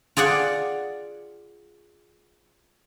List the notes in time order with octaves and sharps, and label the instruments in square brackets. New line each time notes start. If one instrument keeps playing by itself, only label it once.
[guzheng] F4 G#4 D5 F#5